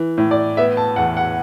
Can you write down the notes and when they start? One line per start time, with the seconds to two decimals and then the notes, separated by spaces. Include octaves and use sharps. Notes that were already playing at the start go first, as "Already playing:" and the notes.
Already playing: E3
0.18 A2
0.31 D5
0.57 B3 E5
0.77 A5
0.96 E2 F#5
1.17 F#5